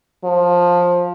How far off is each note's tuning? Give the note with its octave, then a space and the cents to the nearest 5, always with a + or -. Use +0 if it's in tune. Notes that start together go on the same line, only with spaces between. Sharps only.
F3 +15